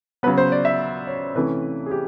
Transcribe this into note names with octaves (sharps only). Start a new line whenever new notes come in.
C#3 F#3 B3 B4
C5
D5
E5
C#5
C3 E3 A3 C#4 B4
G#4
G4